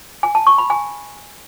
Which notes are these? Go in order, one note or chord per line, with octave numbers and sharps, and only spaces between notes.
G#5
A5
C#6
B5
G#5